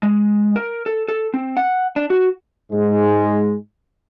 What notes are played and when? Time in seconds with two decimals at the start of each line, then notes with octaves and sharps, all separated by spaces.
0.03 G#3
0.56 A#4
0.86 A4
1.08 A4
1.34 C4
1.57 F#5
1.96 D4
2.10 F#4
2.72 G#2 G#3